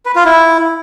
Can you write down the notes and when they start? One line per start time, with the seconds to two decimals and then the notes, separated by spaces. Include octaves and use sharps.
0.06 B4
0.16 F4
0.25 E4